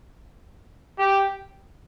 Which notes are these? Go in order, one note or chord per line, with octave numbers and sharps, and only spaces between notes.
G4